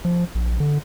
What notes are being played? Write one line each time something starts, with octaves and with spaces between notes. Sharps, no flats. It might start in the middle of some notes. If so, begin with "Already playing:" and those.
F3
A#1
D3